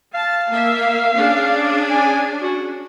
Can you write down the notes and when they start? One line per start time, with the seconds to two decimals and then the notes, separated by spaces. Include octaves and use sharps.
0.14 F5 A5
0.49 A#3 E5
1.16 C#4 D4 G#4
1.91 G#5
2.42 F#4